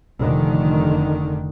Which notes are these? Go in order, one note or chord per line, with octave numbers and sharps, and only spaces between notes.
F1 D3 D#3